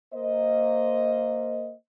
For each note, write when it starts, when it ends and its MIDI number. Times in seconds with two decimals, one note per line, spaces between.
0.13 1.73 58
0.13 1.73 72
0.13 1.73 75